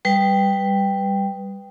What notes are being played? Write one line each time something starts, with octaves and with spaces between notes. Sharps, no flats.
G3 B4 G5